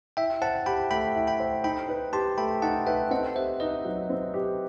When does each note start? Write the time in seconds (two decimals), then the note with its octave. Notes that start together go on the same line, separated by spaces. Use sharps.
0.17 E4 E5 G5
0.41 C5 F#5 A5
0.66 G4 G5 B5
0.90 A3 G5 B5
1.15 E4
1.27 G5 B5
1.40 C5
1.64 D#4 G5 B5
1.89 B4
2.13 G4 A5 C6
2.37 A3 G5 B5
2.62 D#4 F#5 A5
2.87 B4 E5 G5
3.11 C4 D#5 F#5
3.36 G4 C5 E5
3.60 D#4 B4 D#5
3.85 F#3
4.10 C4
4.34 G4